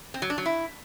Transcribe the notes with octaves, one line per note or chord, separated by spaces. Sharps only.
C4
F#3
D4
F#3
E4